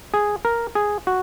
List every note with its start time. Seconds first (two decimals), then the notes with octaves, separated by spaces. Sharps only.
0.14 G#4
0.45 A#4
0.75 G#4
1.07 F#4